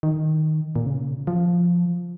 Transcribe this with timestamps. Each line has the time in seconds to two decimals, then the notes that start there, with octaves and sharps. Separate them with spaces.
0.03 D#3
0.76 A#2
0.86 C#3
1.27 F3